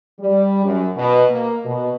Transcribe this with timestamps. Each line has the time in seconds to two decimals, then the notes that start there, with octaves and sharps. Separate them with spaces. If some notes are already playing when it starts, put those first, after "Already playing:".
0.20 G3
0.64 F#2
0.96 B2
1.29 A#3
1.65 B2